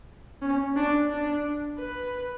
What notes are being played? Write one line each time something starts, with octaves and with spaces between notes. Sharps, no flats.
C#4
D4
D4
B4